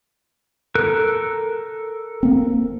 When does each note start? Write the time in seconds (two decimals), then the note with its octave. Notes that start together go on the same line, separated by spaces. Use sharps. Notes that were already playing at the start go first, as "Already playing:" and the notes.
0.75 A4 A#4 F#6
2.23 A#3 C4